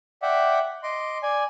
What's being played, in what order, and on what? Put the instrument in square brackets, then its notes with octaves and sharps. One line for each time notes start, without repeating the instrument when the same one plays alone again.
[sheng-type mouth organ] D5 E5 F#5 G5 D6
D#5 C6 D6
D5 G#5